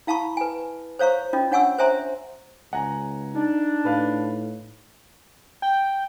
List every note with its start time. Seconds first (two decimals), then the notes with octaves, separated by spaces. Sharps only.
0.07 E4 F5 A5 B5 C#6
0.37 B4 G#5
0.99 C5 C#5 F5 A#5 C#6
1.33 C#4 F4 D#5
1.51 D4 C#5 F#5 G#5 C#6 E6
1.78 C5 C#5 E5 G#5 A#5 C6
2.73 C#2 F#5 G#5 A#5
3.35 D4 D#4
3.85 A2 B4 F5
5.62 G5